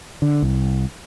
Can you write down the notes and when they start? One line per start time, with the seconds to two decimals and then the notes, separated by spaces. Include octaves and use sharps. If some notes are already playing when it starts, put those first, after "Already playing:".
0.22 D3
0.42 C2